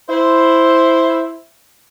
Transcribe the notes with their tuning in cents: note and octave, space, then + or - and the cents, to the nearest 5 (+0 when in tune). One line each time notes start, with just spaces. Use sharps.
E4 +0 C5 +0